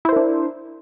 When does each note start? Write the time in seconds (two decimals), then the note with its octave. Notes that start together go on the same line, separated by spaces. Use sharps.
0.05 E4
0.09 C5
0.13 A#4
0.16 D4